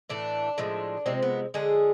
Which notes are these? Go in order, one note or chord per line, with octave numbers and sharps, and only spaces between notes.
A2 E3 A3 D4
A2 F3 G#3
C3 F3 G#3 C4
B3
D3 F3 G#3 G#4